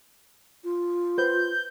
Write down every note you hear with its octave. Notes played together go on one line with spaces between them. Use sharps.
F4
B4 C5 G6